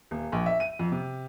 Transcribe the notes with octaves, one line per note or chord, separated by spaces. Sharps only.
D#1
A#1
E5
D#7
F2
C3